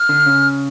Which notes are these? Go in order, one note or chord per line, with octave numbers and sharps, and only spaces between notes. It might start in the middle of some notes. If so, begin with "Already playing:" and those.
Already playing: F6
D3
C#3